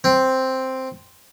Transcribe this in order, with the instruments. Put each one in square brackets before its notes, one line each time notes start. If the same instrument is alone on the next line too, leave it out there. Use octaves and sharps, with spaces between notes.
[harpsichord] C4